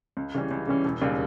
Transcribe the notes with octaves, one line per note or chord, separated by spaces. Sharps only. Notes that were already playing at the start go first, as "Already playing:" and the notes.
C#2
C#3 E3 G3 C#4
C#2
C#3 E3 G3 C#4
E1
D#2 C#3 G3